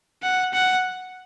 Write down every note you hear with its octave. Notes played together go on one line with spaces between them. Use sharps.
F#5
F#5